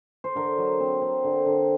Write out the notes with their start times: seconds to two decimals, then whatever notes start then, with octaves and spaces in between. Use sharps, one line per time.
0.24 C5
0.35 D3 A#4
0.58 F#3
0.80 C4
1.01 C4
1.24 D3
1.46 D3